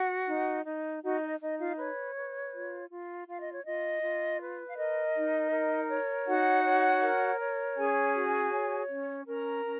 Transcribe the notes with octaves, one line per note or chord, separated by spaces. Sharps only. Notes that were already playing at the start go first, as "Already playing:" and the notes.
Already playing: F#4 F#5
D#4
D#4
D#4 F#4 F#5
D#5
D#4 D#5
F4 F5
B4 C#5
B4
F4
F4
F4 F5
D#5
C#5
F4 D#5
F4
B4
F5
A#4 D#5
D#4
A#4
C#5
D#4 F#4 F#5
C#5
A#4
C#5
C#4 G#4 G#5
F#4
C#5
C#4
C#4 A#4 A#5
C#4